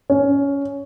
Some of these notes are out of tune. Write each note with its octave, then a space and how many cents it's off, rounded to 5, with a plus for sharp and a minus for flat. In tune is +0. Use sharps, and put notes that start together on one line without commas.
C#4 +15